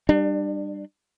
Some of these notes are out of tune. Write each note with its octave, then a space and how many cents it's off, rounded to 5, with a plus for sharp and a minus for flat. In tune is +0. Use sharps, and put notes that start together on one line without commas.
G3 +0 D4 +30